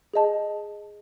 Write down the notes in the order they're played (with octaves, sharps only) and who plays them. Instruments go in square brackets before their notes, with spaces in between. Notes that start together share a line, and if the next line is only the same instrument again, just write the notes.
[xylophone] G#4 D#5 A5